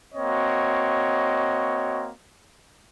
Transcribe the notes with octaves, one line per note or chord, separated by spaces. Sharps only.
A#3 C4 F#4 C#5 D#5